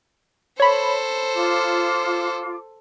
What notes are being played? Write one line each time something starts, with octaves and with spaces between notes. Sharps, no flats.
A4 C5 C#5 B5
F4 D6